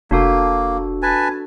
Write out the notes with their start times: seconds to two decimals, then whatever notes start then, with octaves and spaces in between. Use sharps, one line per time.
0.11 F1 A#3 D4 F#4 A4
1.02 B4 G#5 A5